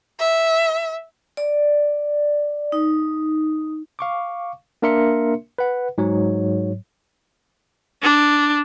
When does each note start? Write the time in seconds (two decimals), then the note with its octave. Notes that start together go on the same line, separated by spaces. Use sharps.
0.19 E5
1.37 D5
2.72 D#4
3.99 F5 C#6 D6
4.82 A#3 D4 A#4 E5 C6 C#7
5.58 B4 F#5
5.98 G#2 F#3 C#5
8.03 D4